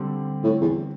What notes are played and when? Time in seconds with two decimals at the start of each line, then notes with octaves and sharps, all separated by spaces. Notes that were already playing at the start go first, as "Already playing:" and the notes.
Already playing: D3 G3 C4 G4
0.44 A2
0.61 E2